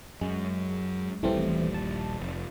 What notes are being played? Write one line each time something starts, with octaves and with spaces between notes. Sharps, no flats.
F#2 G#3
D#1 A#1 E3 G3 A3 C4
A5
F1